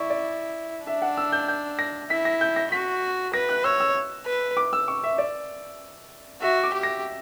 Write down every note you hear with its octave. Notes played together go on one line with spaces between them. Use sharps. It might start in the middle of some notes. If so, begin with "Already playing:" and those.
Already playing: E4 D5 C#6
D5
D4 E5
F#5
E6
G6
G6
A#6
E4 B6
A#6
G6
A#6
F#4 B6
B4 A#6
F#6
C#5 E6
E6
B4
D6
E6
C#6
E5
D5
F#4 E5
D6
G4
A#6